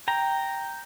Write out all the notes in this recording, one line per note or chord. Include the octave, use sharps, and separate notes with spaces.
G5 A#5